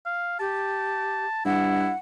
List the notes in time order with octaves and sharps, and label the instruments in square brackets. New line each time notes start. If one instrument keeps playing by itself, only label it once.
[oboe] F5
[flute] G4 [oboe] A5
[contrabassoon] G2 [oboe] E4 [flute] F#5